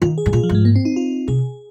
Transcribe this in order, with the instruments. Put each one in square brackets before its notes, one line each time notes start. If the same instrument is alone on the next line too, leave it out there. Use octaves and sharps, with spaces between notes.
[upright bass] D#3 [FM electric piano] F4
[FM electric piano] G#4
[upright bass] G#2
[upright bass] A#2 [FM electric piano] F4
[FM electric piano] F3
[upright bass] G#2
[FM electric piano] G#3
A#3
C4
D#4
F4
[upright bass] C3 [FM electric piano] G#4